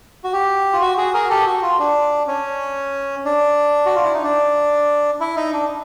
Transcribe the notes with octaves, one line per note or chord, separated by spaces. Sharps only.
F#4
G4
F4
F#4
F#4 G#4
G#4 A#4
G4 A4
F#4
F4
D4
C#4
D4
F#4
F4
E4
D#4
D4
E4
D#4
D4